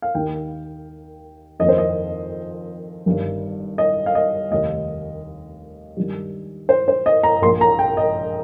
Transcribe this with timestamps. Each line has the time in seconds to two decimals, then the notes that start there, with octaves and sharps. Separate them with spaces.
0.02 F5
0.14 D#2 D#3 A#3 D#4 G5
1.59 F2 D#3 A#3 D#5
1.69 C5
1.78 D#5
3.06 G1 G2 D#3
3.78 D#5
4.06 F5
4.15 D#5
4.51 F1 D#2 D#3 D#5
5.97 G2 D#3 G3
6.69 C5
6.88 C5
7.06 D#5
7.23 A#5
7.42 A#1 A#2 A#3 C6
7.61 A#5
7.79 G5
7.97 D#5